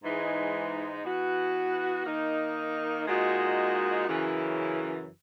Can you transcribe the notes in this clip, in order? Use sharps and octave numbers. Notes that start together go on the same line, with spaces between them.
G#2 E3 G#3 D#4 G#4
E3 B3 F#4 B4
D#3 A#3 D#4
A#2 G#3 D#4 F#4
F#2 C#3 E3